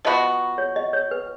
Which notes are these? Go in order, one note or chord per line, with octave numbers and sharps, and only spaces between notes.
F3 B3 F#4 D#5
C#5
D#5
C#5
B4